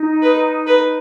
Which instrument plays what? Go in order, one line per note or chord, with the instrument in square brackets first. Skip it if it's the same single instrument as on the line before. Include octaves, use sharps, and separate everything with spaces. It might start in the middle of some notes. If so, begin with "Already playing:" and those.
Already playing: [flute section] D#4
[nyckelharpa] B4
B4